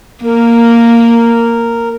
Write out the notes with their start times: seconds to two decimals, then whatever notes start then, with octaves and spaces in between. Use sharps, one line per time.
0.24 A#3 A#4